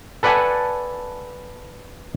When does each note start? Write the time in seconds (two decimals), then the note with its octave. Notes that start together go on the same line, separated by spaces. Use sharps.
0.23 A4 B4 D5 F#5 G#5 A5